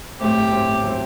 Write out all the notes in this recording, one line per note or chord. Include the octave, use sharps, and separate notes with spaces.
A2 F#3 A3 C4 G4
A2 F#3 A3 C4
A2 F#3 A3 C4